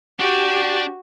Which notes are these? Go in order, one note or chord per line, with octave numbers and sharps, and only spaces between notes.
D4 F#4 G4 D5